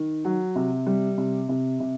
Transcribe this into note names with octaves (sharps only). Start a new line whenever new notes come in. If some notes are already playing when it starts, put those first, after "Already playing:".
Already playing: D#3
F#3
C3
G3
C3
C3
C3